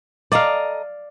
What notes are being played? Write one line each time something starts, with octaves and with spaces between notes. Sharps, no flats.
A4 D5 D#5 F5 A#5